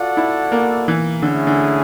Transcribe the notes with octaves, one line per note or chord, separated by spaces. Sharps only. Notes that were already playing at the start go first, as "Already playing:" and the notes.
Already playing: F4 F#4 A4 D5 F#5
E4
A#3
E3
D3 A3 C#4 E4 G#4
D3